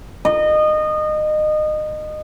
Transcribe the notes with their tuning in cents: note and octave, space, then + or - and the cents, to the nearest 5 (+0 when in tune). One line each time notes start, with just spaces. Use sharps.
D#5 -25